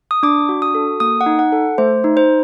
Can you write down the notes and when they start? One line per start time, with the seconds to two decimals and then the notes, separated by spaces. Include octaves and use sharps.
0.11 D#6
0.23 D4 D6
0.49 F#4
0.62 D#6
0.75 A4
1.00 A#3 D#6
1.21 F#5
1.26 D#4
1.39 F#5
1.52 A4
1.78 A3 C5
2.04 D#4
2.17 C5